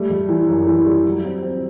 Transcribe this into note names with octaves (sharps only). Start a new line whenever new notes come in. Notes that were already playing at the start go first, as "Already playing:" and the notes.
Already playing: G3 A3
G3
E3
F#2
E3
G3
F#3
C4
C4